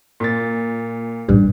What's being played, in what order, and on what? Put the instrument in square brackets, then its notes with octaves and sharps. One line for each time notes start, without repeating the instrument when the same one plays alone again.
[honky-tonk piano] A#2 A6
[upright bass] A1 [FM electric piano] G2